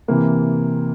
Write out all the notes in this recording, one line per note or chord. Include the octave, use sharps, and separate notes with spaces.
C3 E3 A#3